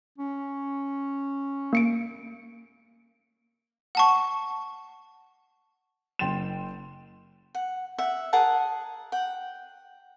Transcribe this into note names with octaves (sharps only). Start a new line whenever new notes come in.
C#4
A#3 C#7 D7
F#5 A5 C#6
F#1 G5 C6 A6 E7
F#5
E5 F#5
G#4 A#4 F#5 A5
F#5 G5